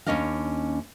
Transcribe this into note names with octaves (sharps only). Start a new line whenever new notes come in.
D#2 F3 C#4 D4 D#5 F5